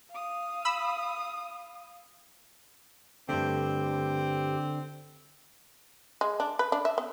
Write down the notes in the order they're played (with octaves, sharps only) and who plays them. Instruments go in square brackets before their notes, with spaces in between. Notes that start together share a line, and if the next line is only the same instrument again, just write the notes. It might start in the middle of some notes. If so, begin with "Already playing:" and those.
[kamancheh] F5 D#6
[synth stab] B5 E6
[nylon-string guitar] G2 A3 [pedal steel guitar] D3 [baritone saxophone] C4 [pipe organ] G4
[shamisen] G#3
D4
B4
D4
E5
B3